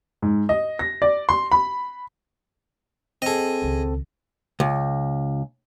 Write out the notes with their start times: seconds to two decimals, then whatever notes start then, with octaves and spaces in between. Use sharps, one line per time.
0.22 G#2
0.49 D#5
0.79 A#6
1.02 D5
1.29 C6
1.52 B5
3.22 C4 G#4 A4 D#5
3.62 C#2 D#3
4.60 C#2